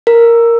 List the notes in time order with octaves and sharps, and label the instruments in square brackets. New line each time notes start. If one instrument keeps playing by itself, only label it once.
[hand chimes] A#4